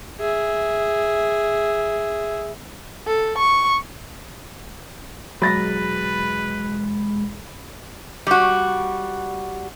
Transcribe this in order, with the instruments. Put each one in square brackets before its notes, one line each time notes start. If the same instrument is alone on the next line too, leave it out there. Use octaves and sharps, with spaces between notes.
[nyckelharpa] G#4 E5
[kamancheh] A4
C#6
[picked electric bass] E1 F#3 [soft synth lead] G#3 [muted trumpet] B4 [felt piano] B5 A6 A#6
[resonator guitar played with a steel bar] G3 F#4